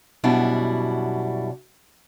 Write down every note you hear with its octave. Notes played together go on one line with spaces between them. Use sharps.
F#2 B2 G3 D4 E4